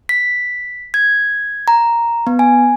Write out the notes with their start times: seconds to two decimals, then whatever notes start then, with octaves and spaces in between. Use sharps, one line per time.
0.09 B6
0.94 G#6
1.68 A#5
2.27 B3
2.39 G#5